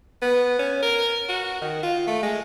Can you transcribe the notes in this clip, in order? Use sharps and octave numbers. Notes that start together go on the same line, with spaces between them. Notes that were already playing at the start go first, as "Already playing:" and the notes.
B3
C#4
A#4
F#4
D#3
F4
A3
G#3